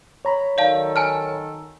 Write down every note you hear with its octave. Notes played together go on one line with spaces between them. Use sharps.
C#5 A#5 B5
D#3 F#3 A4 D5 F5 A5
G#5 A5 F6